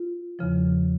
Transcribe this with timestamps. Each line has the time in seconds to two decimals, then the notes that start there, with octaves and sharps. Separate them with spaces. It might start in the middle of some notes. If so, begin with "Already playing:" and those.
Already playing: F4
0.39 E2 C#3 F3